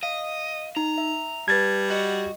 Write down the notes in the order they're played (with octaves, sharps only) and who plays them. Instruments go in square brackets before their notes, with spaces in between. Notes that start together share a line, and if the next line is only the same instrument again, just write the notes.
[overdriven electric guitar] D#5 [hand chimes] F5
[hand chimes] D#4 [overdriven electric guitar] A#5
[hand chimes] E5
[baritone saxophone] G3 [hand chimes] B4 A5 [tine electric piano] G#6 A6
[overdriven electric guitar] F#4 [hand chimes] D#5